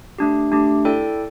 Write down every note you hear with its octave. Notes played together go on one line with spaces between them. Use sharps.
A3 D4 G4
A3 D4 G4
E4 A4 D5 G5